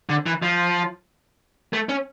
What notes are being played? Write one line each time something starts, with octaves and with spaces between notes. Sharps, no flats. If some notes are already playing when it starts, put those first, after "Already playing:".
D3
E3
F3
A3
C#4